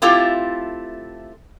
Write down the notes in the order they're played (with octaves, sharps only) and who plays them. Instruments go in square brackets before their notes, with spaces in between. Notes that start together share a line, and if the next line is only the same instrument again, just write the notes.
[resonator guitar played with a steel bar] A3 C4 E4 F4 G4 A4